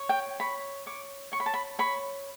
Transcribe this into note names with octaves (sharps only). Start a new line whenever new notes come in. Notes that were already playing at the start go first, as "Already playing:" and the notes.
Already playing: C#5
G5
C#5 B5
C#5 D6
C#5 C#6
B5
A5
B5
C#5 B5